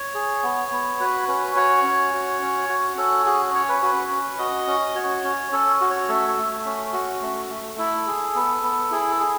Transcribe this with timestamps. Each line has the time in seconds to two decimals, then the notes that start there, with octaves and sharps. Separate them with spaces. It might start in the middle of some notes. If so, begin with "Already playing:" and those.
Already playing: C#5
0.14 G#4
0.43 B3
0.72 B3
1.00 F#4 B4
1.28 C#4 B4
1.56 F#4 C#5
1.84 C#4
2.14 F#4
2.42 C#4
2.69 F#4
2.97 C#4 A4
3.26 F#4 G#4
3.55 C#4 C#5
3.69 B4
3.83 F#4 B4
4.11 C#4
4.39 F#4 D#5
4.67 C#4
4.95 F#4 C#5
5.24 C#4
5.52 C#4 A4
5.81 F#4
5.90 C#5
6.09 A3 A4
6.28 A4
6.37 A3
6.66 C#4
6.93 F#4
7.22 A3
7.50 A3
7.78 E4 A4
8.07 G#4
8.35 B3
8.63 B3
8.91 E4 G#4
9.10 A4
9.20 G#4